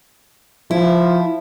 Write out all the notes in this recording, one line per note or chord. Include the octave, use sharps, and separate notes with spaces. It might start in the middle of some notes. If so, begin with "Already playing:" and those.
F3 E4